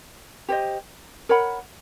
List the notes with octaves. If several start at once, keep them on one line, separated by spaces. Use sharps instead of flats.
G4 C5 D#5
A#4 C#5 F#5 B5